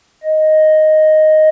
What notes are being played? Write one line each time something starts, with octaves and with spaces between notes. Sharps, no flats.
D#5